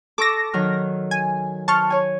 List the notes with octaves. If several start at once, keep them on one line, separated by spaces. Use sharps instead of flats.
A4 C#6 D6 E6 A#6
D#3 F#3 F6
G#5
C5 A5 C#6 F6
C#5 G#5